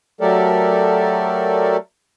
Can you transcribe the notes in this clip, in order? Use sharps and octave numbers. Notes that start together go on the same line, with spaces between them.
F#3 A3 G4 A4 A#4 D5